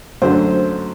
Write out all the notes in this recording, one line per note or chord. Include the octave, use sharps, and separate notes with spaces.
F#2 D3 F#3 A3 C5